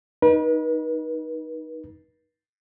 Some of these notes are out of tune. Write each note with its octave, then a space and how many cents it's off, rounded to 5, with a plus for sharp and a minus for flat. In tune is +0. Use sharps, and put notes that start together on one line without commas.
D#4 +0 B4 -40